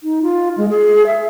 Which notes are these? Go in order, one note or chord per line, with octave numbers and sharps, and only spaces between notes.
D#4
F4
G#3
G#4
E5